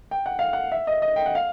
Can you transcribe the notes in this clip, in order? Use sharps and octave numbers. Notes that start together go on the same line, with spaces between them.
G5
F#5
F5
F#5
E5
D#5
D#5
G5
F#5
F5